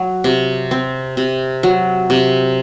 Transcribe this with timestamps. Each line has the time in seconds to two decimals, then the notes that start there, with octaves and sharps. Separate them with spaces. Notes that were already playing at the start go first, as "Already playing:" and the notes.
Already playing: F#3
0.24 C3
0.71 C4
1.17 C3
1.63 F#3
2.10 C3